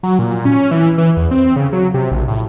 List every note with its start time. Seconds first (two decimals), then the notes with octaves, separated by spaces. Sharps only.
0.03 F#3
0.19 A#2
0.45 C#4
0.71 E3
0.98 E3
1.17 E2
1.31 C4
1.56 C#3
1.73 F#3
1.94 C3
2.11 A#1
2.28 A2